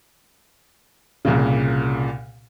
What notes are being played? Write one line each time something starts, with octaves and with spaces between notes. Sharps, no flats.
C2 A#2 C#3